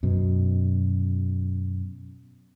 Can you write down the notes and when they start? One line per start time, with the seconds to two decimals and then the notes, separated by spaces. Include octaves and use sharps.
0.03 F#2 B2